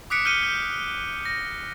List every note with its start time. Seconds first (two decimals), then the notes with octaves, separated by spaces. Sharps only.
0.10 D6 D#6 F#6 B6 C#7 D7
0.25 F6 G6 B6 C#7 D#7 G7
0.43 G6
1.25 A#6